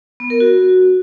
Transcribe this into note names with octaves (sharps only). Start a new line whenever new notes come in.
B3
A#4
F#4